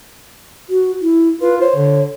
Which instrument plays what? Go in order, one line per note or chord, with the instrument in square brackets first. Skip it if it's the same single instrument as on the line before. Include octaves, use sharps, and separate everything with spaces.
[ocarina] F#4
E4
[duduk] F4 [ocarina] B4
[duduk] C5 [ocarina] C#5
[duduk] D3